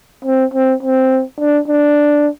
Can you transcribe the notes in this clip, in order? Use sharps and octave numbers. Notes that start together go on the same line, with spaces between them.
C4
C4
C4
D4
D4